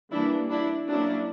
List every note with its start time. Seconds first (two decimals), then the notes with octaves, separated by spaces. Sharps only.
0.11 E3 G3 A#3 D4 E4
0.50 D4 E4
0.87 F#3 A#3 C#4 D4 E4